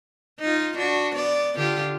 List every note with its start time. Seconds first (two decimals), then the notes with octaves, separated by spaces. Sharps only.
0.41 D#4 F4
0.78 D4 F#4
1.16 B3 D5
1.57 D3 F4 G4